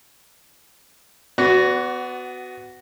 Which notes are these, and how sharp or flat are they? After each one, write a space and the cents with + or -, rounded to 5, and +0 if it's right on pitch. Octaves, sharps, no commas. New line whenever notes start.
B3 +20 F#4 +5 D5 -30